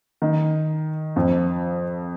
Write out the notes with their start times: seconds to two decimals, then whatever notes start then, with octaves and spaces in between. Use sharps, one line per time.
0.22 D#3
1.16 F2 F3